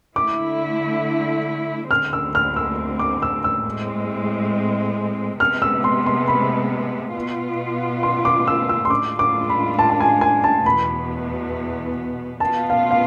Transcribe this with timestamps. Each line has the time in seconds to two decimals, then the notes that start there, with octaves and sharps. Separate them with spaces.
0.16 D3 A3 E4 D6
1.90 D2 D3 G#3 C4 F6
2.13 E6
2.35 F6
2.56 E6
2.99 D6
3.22 E6
3.44 E6
3.65 A2 G#3 C4
5.40 C3 G#3 B3 F6
5.62 E6
5.84 C6
6.06 C6
6.27 B5
7.15 B2 B3 F4
8.03 C6
8.25 D6
8.47 E6
8.69 E6
8.85 C6
8.90 A2 G#3 D4 F4 D6
9.19 D6
9.50 B5
9.79 A5
9.90 A5
10.00 G#5
10.21 G#5
10.44 A5
10.66 E2 B2 B3 B5
12.40 B2 B3 F4 A5
12.70 F5
12.91 F5